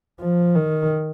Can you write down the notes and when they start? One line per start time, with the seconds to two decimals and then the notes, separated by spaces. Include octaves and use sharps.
0.20 F3
0.55 D#3